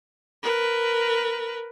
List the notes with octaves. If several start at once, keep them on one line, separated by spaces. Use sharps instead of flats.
A#4 B4